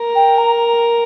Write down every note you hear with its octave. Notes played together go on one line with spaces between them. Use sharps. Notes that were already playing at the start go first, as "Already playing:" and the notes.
Already playing: A#4
G5
A#5